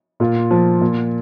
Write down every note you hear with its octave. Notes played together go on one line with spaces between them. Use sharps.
A#2 F4
F3
A#2